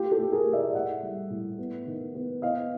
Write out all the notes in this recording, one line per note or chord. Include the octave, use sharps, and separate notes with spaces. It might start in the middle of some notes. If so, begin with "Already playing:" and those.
Already playing: A3 F4 G4
G4 A4
A3
G#4 A#4
A3
D5 E5
A2 E5 F#5
G3
A2
B3
D#3
B3
B3 D#5 F5